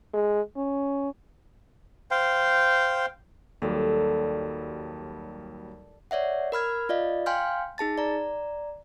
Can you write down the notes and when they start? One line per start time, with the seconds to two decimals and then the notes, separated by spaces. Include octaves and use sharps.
0.13 G#3
0.56 C#4
2.11 C5 F5 G5
3.62 D#2 F#3 G3 A4 D5
6.11 C#5 D5 E5 F#5
6.52 A#4 B5 F6 G#6
6.89 F4 D5 D#5 F5
7.26 F5 G5 G#5 C6 F6 G6
7.78 D#4 G#4 A5 A6
7.98 D5 A#5